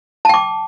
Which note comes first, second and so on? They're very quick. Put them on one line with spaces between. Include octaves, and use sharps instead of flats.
A5 G5 D6